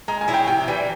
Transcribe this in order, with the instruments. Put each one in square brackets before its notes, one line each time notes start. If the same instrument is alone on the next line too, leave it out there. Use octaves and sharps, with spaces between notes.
[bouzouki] G#3 [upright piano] A#5
[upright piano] G#5
[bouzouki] E4 G#4 C#5
[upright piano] G5
[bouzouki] C3 [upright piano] G5
[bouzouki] E3 G3